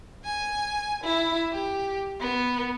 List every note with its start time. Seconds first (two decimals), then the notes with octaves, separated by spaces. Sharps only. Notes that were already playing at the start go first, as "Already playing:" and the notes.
0.25 G#5
1.04 E4
1.51 G4
2.20 B3